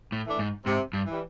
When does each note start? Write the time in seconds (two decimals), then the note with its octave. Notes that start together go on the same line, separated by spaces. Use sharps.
0.12 A2
0.26 E3 A3 D4
0.39 G#2
0.66 G#2 C3
0.93 G2
1.06 E3
1.11 G3